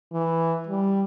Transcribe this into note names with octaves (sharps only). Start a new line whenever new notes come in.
E3
G3